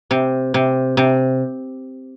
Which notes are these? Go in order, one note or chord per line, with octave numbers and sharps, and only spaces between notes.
C3
C3
C3